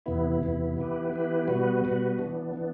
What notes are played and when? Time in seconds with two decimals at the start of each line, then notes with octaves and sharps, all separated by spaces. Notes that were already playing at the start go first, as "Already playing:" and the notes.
0.06 E2 C3 E3 B3 E4
0.42 E2 C3 E3 B3 E4
0.77 E3 B3 E4 G4 B4
1.13 E3 B3 E4 G4 B4
1.47 B2 G3 B3 F#4 B4
1.84 B2 G3 B3 F#4 B4
2.19 E3 B3 D4
2.54 E3 B3 D4